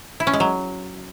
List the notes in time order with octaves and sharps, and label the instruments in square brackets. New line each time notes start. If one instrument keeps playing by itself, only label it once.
[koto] E4
C#4
G#3
F#3